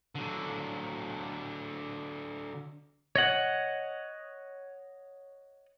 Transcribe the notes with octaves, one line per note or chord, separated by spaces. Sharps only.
D3 F#3
C#5 D#5 F#5